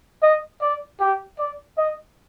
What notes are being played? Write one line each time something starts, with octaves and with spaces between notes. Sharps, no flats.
D#5
D5
G4
D5
D#5